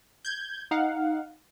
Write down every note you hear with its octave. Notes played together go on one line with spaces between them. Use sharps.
G6 G#6
D#4 F5 F#5